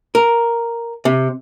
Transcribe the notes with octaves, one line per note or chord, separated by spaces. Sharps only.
A#4
C3